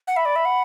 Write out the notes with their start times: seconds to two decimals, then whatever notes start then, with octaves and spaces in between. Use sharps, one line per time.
0.07 F#5
0.16 E5 B5
0.25 D5
0.36 E5
0.45 F#5